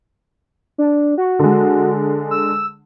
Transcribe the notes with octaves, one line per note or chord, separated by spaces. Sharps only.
D4
F#4
D3 G#3
E6